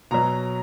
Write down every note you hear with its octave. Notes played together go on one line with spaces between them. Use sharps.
B2 F#3 A#5